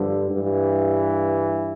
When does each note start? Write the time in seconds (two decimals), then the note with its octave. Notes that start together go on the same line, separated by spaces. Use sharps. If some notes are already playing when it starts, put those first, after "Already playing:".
Already playing: G2 D3 F3
0.30 G2 E3